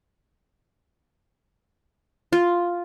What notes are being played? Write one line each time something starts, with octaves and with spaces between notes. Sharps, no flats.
F4